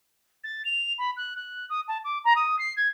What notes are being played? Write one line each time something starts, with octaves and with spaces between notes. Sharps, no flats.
A6
F7
B5
F#6
F#6
D#6
A5
D6
A#5
D#6
C7
G#6